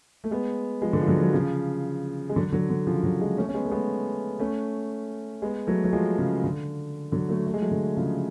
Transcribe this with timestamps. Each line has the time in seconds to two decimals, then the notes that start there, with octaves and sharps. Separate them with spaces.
0.24 A3
0.31 G#3 B3
0.82 F3 G#3
0.93 D3
1.01 F3
1.08 D3 F#3
1.22 F#3
1.33 C#3 F3
2.29 G#3
2.36 D3 F#3
2.52 D3 F#3
2.70 D3
2.87 C#3 F3
3.03 D3 F#3
3.20 F3 G#3
3.38 A3 C#4
3.49 C#4
3.54 G#3 B3
3.66 A3
3.71 G#3 B3
4.39 A3 C#4
5.42 G#3 B3
5.67 F#3 A3
5.84 F#3
5.93 F3 G#3
6.18 C#3
6.44 D3
7.12 D3 F#3
7.29 F#3 A3
7.46 A3
7.54 G#3
7.61 F#3 A3
7.71 D3
7.97 C#3 F3